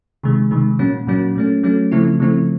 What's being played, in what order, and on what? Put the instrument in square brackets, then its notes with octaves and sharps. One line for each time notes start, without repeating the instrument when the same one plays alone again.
[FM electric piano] C3 D#3 G#3
C3 D#3 G#3
A#2 F#3 A#3 C#4
A#2 F#3 A#3 C#4
F#3 A3 C#4
F#3 A3 C#4
C#3 F3 A3 C4 E4
C#3 F3 A3 C4 E4